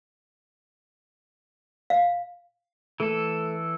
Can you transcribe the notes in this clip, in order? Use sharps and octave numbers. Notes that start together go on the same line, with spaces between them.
F5
E3 A3 A4